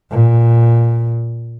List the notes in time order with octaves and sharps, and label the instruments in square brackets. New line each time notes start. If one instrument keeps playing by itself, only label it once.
[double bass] A#2